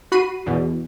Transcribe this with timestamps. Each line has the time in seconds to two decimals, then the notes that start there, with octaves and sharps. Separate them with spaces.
0.12 F#4 B5 C7 D#7
0.46 E2 B2